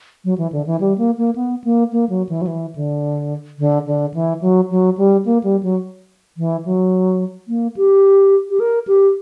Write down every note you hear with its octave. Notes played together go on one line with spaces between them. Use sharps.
F#3
E3
D3
E3
G3
A#3
A#3
B3
A#3
A#3
F#3
E3
F#3
E3
D3
D3
D3
E3
F#3
F#3
G3
A#3
G3
F#3
E3
F#3
A#3
G4
G4
A#4
G4